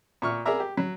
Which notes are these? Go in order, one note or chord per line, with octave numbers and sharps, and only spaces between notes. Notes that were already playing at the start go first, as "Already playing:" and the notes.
A#2 C#6 F6
G#4 A#4 D5 E5 A#5
G4
F#3